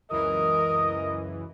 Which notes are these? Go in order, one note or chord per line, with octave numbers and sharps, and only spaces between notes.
C#2 F#2 E3 A#4 D#5 D#6